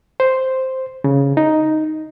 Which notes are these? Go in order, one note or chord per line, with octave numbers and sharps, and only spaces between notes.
C5
C#3
D#4